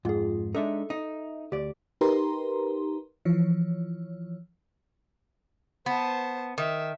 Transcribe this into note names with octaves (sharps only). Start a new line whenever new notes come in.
F2 G#2 F4 G#4
G#3 D4 D#4 A4 E5
D#4
D2 G4 D5
D#4 G4 A#4 B4 A#5 C6
E3 F3 C#5
B3 C5 A5
D#3 E5